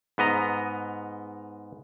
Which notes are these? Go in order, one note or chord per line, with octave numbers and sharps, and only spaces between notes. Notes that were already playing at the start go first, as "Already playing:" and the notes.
G#2 B3 D#5 A#5